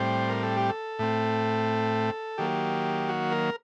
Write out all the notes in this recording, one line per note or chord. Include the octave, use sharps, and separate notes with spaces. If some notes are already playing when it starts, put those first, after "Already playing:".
Already playing: A2 G3 C4 C5
A#4
A4
G4
A4
A2 A3 C4
D#3 F#3 A#3 G4
F#4
A#4